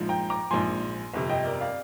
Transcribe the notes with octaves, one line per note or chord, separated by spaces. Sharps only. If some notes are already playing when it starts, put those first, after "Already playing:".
Already playing: A#1 G#2 F3
G5 A#5
A#5 D6
A#1 G#2 F3 G#5 C6
G1 F2 C3
D#5 G5
A#4 D5
D5 F5